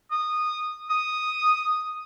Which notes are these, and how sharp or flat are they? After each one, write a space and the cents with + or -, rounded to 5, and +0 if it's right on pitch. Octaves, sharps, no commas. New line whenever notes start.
D#6 -15
D#6 +0